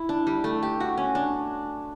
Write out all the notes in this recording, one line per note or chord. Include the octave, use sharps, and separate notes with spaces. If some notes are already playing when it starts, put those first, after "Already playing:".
Already playing: E4
D4
G3
A3
G4
F#4
C#4
D4